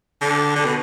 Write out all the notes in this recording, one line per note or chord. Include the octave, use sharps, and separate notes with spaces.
D3
D3
B2